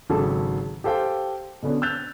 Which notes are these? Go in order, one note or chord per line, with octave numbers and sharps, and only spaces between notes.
G#1 C#3 F#3 A4 A5
G4 A4 C5 F5 G5
B2 D3 B3 C#4 D4
E6 F#6 G6 A6 F7